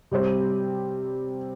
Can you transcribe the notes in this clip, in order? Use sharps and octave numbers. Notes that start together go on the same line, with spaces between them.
C3 G3 C4 G4 C5